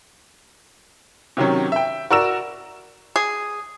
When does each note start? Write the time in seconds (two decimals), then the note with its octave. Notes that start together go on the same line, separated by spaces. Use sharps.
1.37 C3 D#3 F#3 C#4
1.72 E5 G5
2.10 F#4 A#4 D5 E6 E7
3.16 G#4